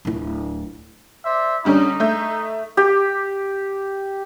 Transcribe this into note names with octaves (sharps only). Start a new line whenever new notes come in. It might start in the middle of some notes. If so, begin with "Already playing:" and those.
D1 E4
C5 D5 E5
D3 G3 C#4 D#4
A3 E5 G6
G4